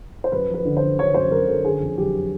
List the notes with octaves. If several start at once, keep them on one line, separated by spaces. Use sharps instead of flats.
C5
F#2 B4
F3 B4
D3
C5
D3
D3 C#5
F#2 C5
F#2 A#4
F#2 A4
D3 G#4
F2
F#3 G4